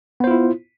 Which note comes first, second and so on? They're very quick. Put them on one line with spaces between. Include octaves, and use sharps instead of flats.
B3 C5 F4 E4